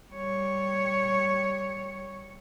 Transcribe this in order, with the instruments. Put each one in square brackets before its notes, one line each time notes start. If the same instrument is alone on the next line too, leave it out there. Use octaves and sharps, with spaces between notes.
[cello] G3 C#5